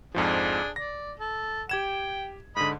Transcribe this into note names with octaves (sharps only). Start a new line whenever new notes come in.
F2 G#2 F3 D4 G#4
D5 A#6
A4
G4 G5 G#6 E7
G#2 D3 D#5 B5